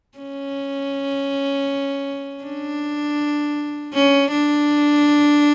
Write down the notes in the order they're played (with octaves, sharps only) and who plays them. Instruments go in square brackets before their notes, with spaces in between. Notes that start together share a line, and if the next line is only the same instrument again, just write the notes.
[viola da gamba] C#4
D4
C#4
D4